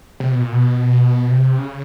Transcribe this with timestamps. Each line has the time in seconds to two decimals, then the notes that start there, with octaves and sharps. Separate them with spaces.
0.20 C3
0.31 B2
0.42 A#2
0.52 B2
1.31 C3
1.58 C#3